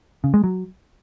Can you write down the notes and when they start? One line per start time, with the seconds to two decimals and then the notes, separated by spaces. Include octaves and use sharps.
0.24 C#3
0.34 G#3
0.44 F#3